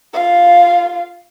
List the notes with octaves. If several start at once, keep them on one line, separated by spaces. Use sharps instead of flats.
F4 F5